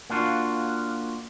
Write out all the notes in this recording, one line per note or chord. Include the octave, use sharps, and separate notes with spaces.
A#3 D4 F4 F#4